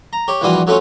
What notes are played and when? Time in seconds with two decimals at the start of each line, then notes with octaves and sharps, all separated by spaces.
0.13 A#5
0.28 G4 C#5
0.41 A#1 E3 G3 F4 F#4 D#6
0.67 F#3 A3 C#4 F4 C#5